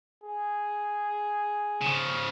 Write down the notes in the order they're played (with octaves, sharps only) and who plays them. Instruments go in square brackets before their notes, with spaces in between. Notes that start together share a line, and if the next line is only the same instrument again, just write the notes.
[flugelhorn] G#4
[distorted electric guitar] C#3 F3